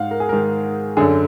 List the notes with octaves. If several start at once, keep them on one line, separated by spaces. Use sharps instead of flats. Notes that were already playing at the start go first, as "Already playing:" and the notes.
Already playing: G#2 F5 F#5
A#4
G#4
G#2 D#3 A#4
F#2 D3 G#4